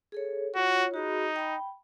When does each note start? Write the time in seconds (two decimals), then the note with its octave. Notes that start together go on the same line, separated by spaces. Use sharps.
0.12 G#4 A4 C#5
0.55 F4 F#4 C#5
0.94 D#4 F#4 G#4 B5
1.36 G5 B5